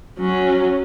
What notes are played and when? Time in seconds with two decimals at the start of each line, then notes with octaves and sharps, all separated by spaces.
0.19 F#3 C#4